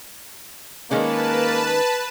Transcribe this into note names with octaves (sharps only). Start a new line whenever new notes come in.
D#3 G#3 A#3 C#4 B4 A5